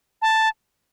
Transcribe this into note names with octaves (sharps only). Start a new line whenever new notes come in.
A5